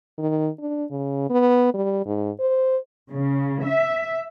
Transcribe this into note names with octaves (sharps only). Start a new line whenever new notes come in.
D#3
D4
C#3
B3
G3
G#2
C5
C#3
E5